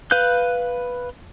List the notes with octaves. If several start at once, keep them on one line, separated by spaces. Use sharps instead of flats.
B4 F5 F#6 G6